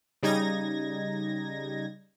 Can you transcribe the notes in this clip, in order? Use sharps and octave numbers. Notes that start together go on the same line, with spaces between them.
C#3 G3 D#4 G#6 A#6